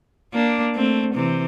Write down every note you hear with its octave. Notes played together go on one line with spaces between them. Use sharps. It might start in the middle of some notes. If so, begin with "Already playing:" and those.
A#3 D4
A3 C4
C3 E3